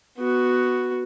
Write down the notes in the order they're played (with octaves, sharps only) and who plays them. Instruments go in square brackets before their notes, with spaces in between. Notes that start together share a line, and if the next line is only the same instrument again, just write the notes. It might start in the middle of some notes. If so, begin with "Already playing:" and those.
[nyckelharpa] B3 F#4